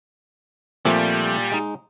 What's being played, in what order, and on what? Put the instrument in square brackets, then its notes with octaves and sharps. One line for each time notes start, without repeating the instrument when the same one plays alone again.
[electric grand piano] A#2 [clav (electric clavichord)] F3 A3 C4 [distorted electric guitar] G3
[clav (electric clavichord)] G#3 D#4